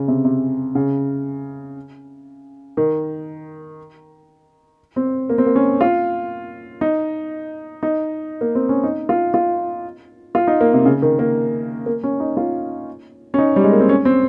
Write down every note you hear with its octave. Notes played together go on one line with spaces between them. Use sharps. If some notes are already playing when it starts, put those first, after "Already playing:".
Already playing: C#3
C3
C3
C#3
D#3
C4
A#3
C4
A#3
C#4
F4
D#4
D#4
A#3
C4
C#4
D#4
F4
F4
F4
D#4
A#3
C3
C#3
D#3
A#3
A#3
C#4
D#4
F4
C#4
D#4
G3
G#3
A#3
C4
C#4
C4